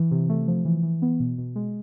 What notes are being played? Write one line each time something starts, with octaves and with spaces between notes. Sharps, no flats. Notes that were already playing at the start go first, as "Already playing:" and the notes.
Already playing: E3
C3
A3
F3
E3
E3
B3
B2
B2
G#3